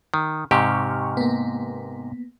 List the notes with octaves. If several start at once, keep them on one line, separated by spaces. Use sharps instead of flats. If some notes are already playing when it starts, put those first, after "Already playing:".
D#3
G#2 C3 G4 C#6 F6
A#3 B3